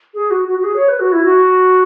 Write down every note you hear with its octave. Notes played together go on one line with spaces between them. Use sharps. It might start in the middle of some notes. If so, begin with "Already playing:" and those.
G#4
F#4
F#4
F#4
G#4
C#5
B4
F#4
E4
F#4